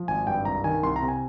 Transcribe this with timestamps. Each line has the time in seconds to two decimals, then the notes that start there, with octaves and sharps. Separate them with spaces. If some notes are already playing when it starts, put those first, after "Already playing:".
Already playing: F3
0.08 G#1 G#5
0.27 G2 G5
0.45 C2 A#5
0.64 D#3 G#5
0.83 C2 C6
0.96 A#5
1.02 C3
1.08 G#5